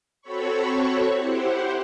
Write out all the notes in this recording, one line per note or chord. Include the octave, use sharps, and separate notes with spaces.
C4 F#4 A4 C#5 B5 C#6
E4 G4 C5 F#5